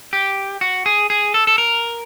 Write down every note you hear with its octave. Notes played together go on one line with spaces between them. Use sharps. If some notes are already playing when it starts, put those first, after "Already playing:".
G4
F#4
G#4
G#4
A4
A4
A#4